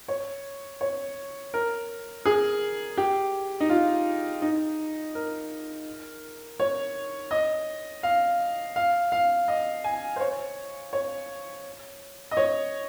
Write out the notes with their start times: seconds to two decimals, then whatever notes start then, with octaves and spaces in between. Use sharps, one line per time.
0.08 C#5
0.81 C#5
1.54 A#4
2.26 G#4
2.97 G4
3.60 D#4
3.69 F4
4.42 D#4
5.15 A#4
6.60 C#5
7.31 D#5
8.03 F5
8.76 F5
9.12 F5
9.48 D#5
9.84 G#5
10.16 C5
10.21 C#5
10.93 C#5
12.31 D#5
12.37 C#5